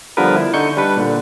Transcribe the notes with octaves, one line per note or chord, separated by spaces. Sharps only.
D3 F3 G3 B3 A#4 B4
E4
D3 D#4 C#6 G6 C#7
G3 D4 B4
A#2 D3